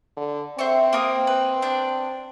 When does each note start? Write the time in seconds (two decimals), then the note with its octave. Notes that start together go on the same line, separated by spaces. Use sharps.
0.17 D3
0.59 C4 C5 E5 C#6
0.93 A#3 A#4 D#6
1.27 B4
1.62 D4 G5